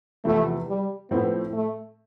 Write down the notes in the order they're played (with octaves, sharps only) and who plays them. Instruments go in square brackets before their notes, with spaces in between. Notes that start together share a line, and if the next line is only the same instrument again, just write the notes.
[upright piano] E2 C3 F3 B3 E4 [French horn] A3
[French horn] G3
[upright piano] A2 F3 C4 E4 [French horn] B3
[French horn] A3